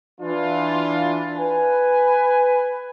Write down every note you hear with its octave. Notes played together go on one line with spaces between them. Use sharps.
E3 D4 F4
B4 G#5